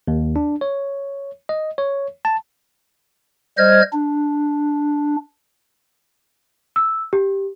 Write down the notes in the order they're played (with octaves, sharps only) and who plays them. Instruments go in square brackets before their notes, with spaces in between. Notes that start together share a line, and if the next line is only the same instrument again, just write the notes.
[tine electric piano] D#2
D4
C#5
D#5
C#5
A5
[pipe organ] G3 C5 D#5 F6 G#6
D4
[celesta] E6
G4